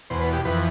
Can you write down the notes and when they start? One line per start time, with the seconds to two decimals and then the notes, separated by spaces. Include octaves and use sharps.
0.10 E2 B2 C5
0.21 B4
0.33 G4
0.45 F2 E3 B4